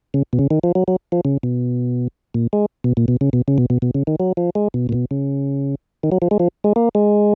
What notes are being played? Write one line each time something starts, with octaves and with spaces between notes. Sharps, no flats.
C#3
B2
C#3
D#3
F3
F#3
F#3
F3
C#3
B2
A#2
G#3
B2
A#2
B2
C#3
B2
C#3
B2
B2
B2
C#3
D#3
F#3
F3
G#3
B2
A#2
B2
C#3
D#3
F#3
F3
G#3
F3
G#3
A#3
G#3